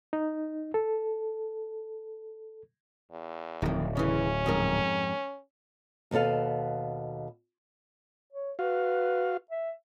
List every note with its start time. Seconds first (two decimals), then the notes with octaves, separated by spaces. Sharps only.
0.13 D#4
0.74 A4
3.11 E2
3.62 D1 F2 D#3
3.97 C#3 E3 C#4
4.46 F2 G#2 A#4
6.11 D#2 B2 B3 A4 F5
8.32 C#5
8.59 F#4 B4 F5
9.51 E5